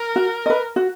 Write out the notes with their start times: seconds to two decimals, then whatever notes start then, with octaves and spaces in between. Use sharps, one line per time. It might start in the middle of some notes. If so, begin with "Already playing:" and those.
Already playing: A#4
0.16 F#4
0.46 B4 D#5
0.76 F#4